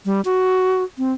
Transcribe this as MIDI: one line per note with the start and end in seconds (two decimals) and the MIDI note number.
0.05 0.21 55
0.25 0.84 66
0.98 1.13 60